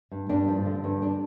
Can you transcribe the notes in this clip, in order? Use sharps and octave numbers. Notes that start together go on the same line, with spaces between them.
G2
G2 D4
F3
D3
G2
D4